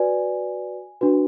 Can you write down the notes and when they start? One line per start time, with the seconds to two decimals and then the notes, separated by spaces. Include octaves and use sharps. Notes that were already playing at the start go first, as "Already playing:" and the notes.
Already playing: F#4 B4 D5 G#5
1.01 D4 F#4 B4